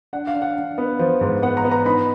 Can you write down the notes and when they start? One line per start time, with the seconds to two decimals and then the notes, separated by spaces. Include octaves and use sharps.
0.13 D4 F#5
0.27 F5
0.34 D4
0.42 F#5
0.57 D4
0.78 B3
0.99 F3
1.21 G#2
1.42 B3 F#5
1.57 A#5
1.64 B3
1.71 A#5
1.85 D#4 B5